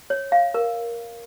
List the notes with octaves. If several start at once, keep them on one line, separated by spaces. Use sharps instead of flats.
C#5
F5
A#4